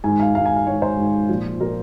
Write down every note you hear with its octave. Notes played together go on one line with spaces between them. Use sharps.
G#2 D#3 G#5
F5
G#2 D#3 F5
G#5
F5
G#2 D#3 C#5
C5
G#2 D#3
A#2 F3
A#2 F3 A#4